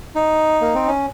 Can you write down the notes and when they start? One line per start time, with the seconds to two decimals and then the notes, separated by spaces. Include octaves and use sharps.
0.15 D#4
0.61 A#3
0.75 C4
0.87 C#4